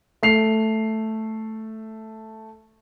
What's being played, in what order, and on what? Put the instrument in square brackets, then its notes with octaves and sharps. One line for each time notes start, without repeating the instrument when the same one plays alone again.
[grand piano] A3 C7 F7